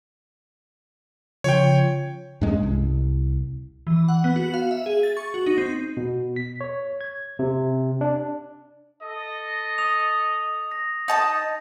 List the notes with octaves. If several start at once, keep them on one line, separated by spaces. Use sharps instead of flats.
C#3 F3 F4 C#5 G5
G2 G#3 C#4
C2
E3
F#5
B3
F#4
F5
E5
G#4
A6
C#6
F#4
D#4
C4
B2
B6
C#5
G#6
C3
D4
A4 D#5
D#6 F7
A#6
D#4 A5 D#6